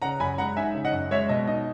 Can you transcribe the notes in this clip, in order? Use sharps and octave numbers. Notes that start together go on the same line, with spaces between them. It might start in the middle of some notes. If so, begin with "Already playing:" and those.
C#3 F#5 A#5
F#2 G#5 B5
G#3 F#5 A#5
D#4 E5 G#5
C#3
D#5 F#5
F#2
G#3 C#5 E5
B2 D#5
D#4 D#5